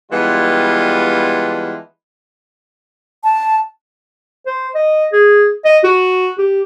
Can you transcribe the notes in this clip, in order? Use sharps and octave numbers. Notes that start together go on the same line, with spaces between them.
E3 G3 G#3 B3 D4 F4
A5
C5
D#5
G#4
D#5
F#4
G4